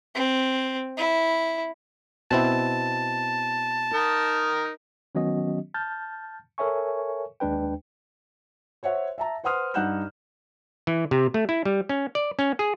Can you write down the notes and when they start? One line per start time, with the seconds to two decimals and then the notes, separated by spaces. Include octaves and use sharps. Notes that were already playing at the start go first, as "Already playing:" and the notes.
0.15 C4
0.97 E4
2.31 B2 C4 E4 A5
3.94 D#4 A#4
5.15 D#3 F#3 B3 C#4 F#4 D#5
5.74 A5 F6 G6 A6
6.58 A4 A#4 C#5 E5 G#5 C#6
7.40 D#2 G#3 D4 B4 G5
8.83 C5 C#5 E5 F#5
9.18 E5 A5 A#5
9.44 B4 C5 F#5 C6 D#6 F6
9.74 G2 D#4 F#5 F#6 G6 E7
10.87 E3
11.11 C3
11.34 A3
11.49 E4
11.65 G3
11.89 C#4
12.15 D5
12.39 C#4
12.59 G#4